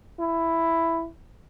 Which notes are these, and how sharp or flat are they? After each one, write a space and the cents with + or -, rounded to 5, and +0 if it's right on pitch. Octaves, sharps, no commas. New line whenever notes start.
E4 +5